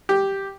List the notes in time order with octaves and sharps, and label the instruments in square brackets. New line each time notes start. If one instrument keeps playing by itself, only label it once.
[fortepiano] G4